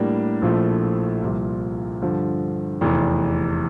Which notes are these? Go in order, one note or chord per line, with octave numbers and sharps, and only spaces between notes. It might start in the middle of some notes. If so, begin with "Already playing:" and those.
Already playing: A2 G3 A#3 D4
A#1 A#2 F3 A3 E4
C2 A#2 F3
G2 D3 F3
F1 E2 E3